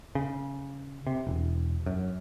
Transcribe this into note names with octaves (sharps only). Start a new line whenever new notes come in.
C#3
C3
E1
F#2